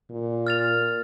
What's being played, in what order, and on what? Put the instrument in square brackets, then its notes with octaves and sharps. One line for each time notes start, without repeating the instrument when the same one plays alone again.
[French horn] A#2
[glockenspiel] F6 A6 F7